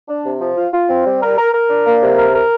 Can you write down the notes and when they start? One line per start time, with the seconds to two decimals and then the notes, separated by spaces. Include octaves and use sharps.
0.08 D4
0.25 C3
0.41 F3
0.57 F4
0.73 F4
0.90 C4
1.05 G3
1.22 A#4
1.38 A#4
1.54 A#4
1.70 D4
1.86 A#3
2.02 C3
2.18 A#4
2.34 A#4